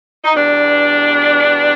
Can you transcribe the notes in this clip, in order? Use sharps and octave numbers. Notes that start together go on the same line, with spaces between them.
D#4
E2 B2 G3 D4